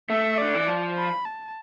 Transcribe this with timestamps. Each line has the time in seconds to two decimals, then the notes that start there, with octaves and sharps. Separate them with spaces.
0.10 A3 E5
0.38 D3 D5
0.55 E3
0.67 F3
0.97 B5
1.25 A5